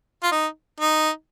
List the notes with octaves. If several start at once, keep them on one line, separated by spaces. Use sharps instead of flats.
F4
D#4
D#4